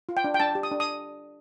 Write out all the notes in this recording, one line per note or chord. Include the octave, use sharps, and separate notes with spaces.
F4
G5
D4
G5
D4 A5
G4
D#6
D4
D#6